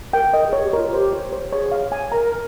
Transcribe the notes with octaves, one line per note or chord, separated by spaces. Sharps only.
A#4 G5
A#4 D#5
G#4
C#5
G4
F4 A#4
G4 C5
C#5
C5
G#4 C#5
F5
G#5
A#4 A#5